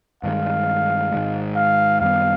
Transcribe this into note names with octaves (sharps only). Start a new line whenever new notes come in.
G2 D#3 G#3 F5
G#2 D#3 G#3
F5
F#2 D#3 G3 B3 F5